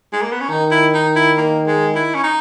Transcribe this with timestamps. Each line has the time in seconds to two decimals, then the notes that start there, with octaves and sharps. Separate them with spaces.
0.13 G#3
0.22 A#3
0.32 B3
0.40 C#4
0.49 D#3 D#4
0.71 E4
0.94 D#4
1.16 E4
1.37 A#3
1.67 G#3
1.95 E4
2.15 C#4
2.24 D#4